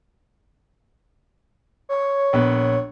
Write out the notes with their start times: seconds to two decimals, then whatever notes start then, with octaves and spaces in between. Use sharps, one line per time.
1.89 C#5
2.33 A#1 B3